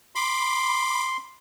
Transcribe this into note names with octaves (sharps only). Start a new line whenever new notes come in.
B5 C6 D6